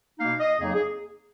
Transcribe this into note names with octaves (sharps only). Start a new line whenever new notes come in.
B2 A#3 D#4 F5
D#5
F2 C#3 F#3 A#3 D#4 G#4
G#4